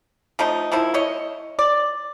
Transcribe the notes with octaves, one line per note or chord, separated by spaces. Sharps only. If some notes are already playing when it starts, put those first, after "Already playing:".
F3 A3 D#4
D#3 F3 A3 E4
E4 C#5 D#5
D5